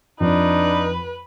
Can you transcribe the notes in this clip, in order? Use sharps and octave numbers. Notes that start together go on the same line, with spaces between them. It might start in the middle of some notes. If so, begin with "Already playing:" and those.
F2 D4 D#4 B4